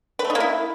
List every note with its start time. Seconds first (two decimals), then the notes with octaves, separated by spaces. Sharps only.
0.19 B4
0.25 A3
0.30 D#4
0.35 A#3
0.40 E4